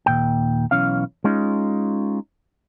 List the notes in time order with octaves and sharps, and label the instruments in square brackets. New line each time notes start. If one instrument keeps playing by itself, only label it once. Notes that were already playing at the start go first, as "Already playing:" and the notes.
[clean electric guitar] D#2 A#2 G5
B1 E3 C#4 F5
G#3 C#4 D#4 F4